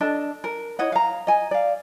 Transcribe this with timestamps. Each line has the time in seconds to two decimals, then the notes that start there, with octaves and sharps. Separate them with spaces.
0.01 D4 A4 D#5 A5
0.44 A#4
0.79 E4 C#5 D#5 F#5
0.92 F5 A#5
1.27 D#5 G#5
1.51 D5 F5